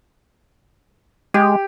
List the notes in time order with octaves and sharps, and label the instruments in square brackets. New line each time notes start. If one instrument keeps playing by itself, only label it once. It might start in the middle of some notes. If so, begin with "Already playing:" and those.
[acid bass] G#3 [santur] G4